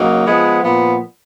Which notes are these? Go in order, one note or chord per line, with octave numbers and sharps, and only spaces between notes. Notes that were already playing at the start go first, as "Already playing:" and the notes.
Already playing: C#3 F#3 A#3 D#4
F3 G#3 B3
A#2 F3 B3